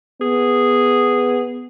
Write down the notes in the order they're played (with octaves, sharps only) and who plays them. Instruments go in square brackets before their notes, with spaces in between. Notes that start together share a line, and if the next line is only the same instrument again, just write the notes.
[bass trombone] B3 [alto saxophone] G#4